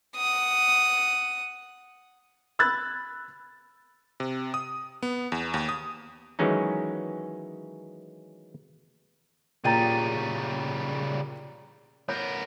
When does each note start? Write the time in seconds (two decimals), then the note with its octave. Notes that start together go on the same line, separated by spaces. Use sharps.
0.17 F#5 D#6
2.59 B5 E6 F#6 G#6 A6
4.20 C3
4.54 D#6
5.03 B3
5.32 E2
5.54 D#2
5.69 D#6
6.39 D#3 E3 F#3 G#3 C#4 D#4
9.65 A#2 C#3 G3 G5 A#5 A6 D#7
12.09 B3 A#4 C#5 G6